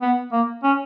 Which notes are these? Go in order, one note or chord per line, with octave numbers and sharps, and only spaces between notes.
B3
A#3
C#4